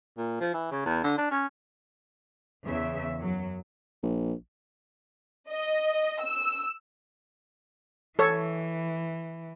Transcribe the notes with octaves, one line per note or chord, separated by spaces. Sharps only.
A#2
F3
E3
C#3
E2
D3
D4
C#4
E2 C#3 E5
F#2 F#3
A#1
D#5
E6
E3 A4 C#5